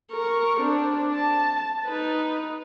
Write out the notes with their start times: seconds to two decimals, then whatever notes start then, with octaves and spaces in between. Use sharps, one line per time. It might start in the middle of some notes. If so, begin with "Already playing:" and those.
0.12 A#4 C#6
0.60 C4 D4
1.14 A5
1.85 D#4 B4